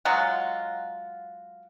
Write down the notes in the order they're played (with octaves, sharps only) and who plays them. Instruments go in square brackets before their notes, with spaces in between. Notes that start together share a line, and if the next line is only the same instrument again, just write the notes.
[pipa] F#3 G#3 F4 F#4